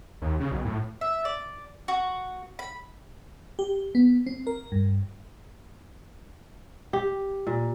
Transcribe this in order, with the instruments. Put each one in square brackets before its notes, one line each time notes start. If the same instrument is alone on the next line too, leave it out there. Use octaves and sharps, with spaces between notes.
[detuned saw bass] D#2
C#3
B1
A2
[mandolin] E5
D5
F#4
B5
[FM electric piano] G4
B3
C4
A#4
G2
[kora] G4
A#2